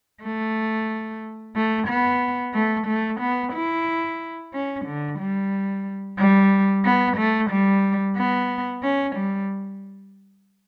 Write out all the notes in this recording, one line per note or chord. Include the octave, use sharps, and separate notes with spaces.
A3
A3
B3
A3
A3
B3
E4
C#4
D3
G3
G3
B3
A3
G3
B3
C#4
G3